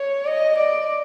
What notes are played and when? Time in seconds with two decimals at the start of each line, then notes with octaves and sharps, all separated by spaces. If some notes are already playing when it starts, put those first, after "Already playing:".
Already playing: C#5
0.26 D#5
0.58 D5